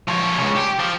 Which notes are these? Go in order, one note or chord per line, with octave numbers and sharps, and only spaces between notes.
F3 C#5
C#2 C#3
G4
F3